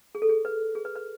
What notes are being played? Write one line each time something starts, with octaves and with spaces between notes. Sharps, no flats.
G#4
A4
G#4
B4
G#4
B4
B4